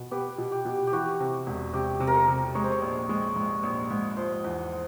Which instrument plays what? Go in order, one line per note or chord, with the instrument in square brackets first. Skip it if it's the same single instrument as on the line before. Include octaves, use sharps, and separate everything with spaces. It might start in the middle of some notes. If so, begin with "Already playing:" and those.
Already playing: [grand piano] B2
[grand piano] B3 [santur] G4
[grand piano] B2
[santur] G4
[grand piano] B2
[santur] G4
[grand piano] E3 [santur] F#4
[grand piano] C3
E1
[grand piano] C3 [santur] G4
[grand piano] C3
[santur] A#4
A4
[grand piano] C3
[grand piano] G#3 [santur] C#5
[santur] C5
C#5
[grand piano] A#1
G#3
G#2
A#1
G#2
[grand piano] F3 [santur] C5
[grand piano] E2